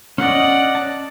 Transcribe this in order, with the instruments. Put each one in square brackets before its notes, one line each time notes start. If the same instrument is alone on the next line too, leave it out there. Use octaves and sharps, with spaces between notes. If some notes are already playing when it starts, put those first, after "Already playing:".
[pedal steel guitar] C#4 D#5 [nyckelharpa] D5 F#5
[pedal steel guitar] A5